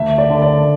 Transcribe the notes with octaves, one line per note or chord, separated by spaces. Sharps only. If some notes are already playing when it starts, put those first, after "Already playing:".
Already playing: D2 E5
D5
D3
D5